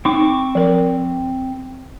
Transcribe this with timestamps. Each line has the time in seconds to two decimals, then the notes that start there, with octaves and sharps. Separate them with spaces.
0.05 C4 D#4 C#6 D6
0.55 F3 A#4